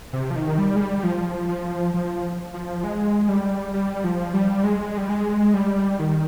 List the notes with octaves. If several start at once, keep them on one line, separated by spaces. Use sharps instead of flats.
C3
F3
D#3
G3
G#3
G3
F3
F3
F3
F3
G#3
G3
G3
F3
G3
G#3
G3
G#3
G3
D#3